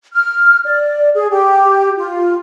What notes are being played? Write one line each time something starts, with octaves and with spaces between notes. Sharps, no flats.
F6
D5
G#4
G4
F4